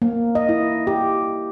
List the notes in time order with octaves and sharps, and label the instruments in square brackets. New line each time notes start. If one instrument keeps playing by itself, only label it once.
[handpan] A#3
D#5
E4
G4